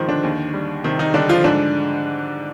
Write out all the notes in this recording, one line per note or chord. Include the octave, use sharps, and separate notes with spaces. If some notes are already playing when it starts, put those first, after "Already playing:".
Already playing: G#2 D#3 F3 C5
D3 D4
D#2
G3
C3 D#3 C4
D#3 D#4
D3 G3 D4
F3 F4
G#2 D3 D4